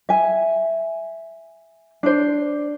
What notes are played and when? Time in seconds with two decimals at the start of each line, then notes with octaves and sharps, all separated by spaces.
0.09 E5 G#5
2.03 D4 C5